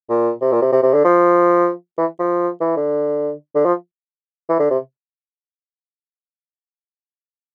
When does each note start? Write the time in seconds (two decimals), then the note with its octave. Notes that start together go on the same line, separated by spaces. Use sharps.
0.10 A#2
0.41 C3
0.52 A#2
0.62 C3
0.72 C3
0.83 C3
0.94 D3
1.04 F3
1.98 E3
2.19 F3
2.61 E3
2.77 D3
3.55 D3
3.66 F3
4.49 E3
4.59 D3
4.71 C3